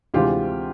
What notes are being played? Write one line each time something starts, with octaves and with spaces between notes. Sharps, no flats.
D2 C3 E3 G#3 F4 G4